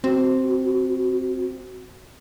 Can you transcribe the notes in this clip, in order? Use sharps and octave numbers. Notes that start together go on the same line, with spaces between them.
C4 F#4